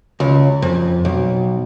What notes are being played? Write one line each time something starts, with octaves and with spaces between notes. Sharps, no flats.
C#2
F2
B1